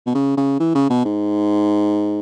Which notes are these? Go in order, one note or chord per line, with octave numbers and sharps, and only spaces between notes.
B2
C#3
C#3
E3
C#3
B2
G#2